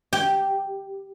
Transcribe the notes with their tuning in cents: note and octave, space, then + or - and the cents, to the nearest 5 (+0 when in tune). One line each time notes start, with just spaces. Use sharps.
G4 -5 G5 +0